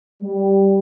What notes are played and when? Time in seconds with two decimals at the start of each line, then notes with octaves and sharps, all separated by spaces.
0.23 G3